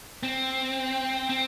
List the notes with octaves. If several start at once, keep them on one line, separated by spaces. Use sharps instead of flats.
C4
C4